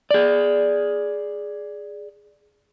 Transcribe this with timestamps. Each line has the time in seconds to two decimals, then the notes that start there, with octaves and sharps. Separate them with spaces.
0.11 G#4 D5